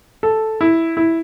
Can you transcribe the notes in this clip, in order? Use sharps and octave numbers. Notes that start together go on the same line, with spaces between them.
A4
E4
E4